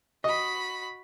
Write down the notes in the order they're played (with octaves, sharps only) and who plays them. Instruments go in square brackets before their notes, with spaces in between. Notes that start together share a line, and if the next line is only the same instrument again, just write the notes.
[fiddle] F#4 B5 [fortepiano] D#5